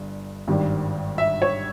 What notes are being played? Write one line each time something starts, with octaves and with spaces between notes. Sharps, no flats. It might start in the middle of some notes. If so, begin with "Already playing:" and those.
Already playing: G1 G2
G#1 G2 D#3 G3
E5
C#5